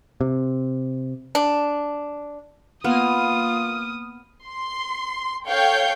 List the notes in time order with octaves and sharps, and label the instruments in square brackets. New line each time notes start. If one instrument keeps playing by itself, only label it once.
[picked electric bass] C3
[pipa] D4
[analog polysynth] A#3 F6 D#7 [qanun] B3 [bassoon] F4 [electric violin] D#6
[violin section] C6
A4 C#5 F5 G5 G6